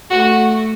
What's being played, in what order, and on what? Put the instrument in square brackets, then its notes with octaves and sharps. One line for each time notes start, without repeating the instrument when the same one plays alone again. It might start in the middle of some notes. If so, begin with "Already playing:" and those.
[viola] A3 [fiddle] F#4